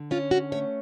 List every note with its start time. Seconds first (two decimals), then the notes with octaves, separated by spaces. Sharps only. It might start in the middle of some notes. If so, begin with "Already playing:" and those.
Already playing: D3
0.11 C#4 F4
0.31 F#4
0.52 A3 C#5